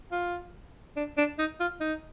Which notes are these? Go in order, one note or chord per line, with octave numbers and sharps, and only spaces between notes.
F4
D4
D4
D#4
F4
D#4